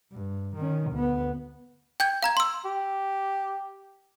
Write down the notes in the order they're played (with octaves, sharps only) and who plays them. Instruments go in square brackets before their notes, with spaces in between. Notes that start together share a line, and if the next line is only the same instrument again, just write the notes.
[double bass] G2
D#3 C#4
D2 B3
[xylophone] G5 G6 G#6
F5 A#5 G#6
C6 E6
[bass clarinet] G4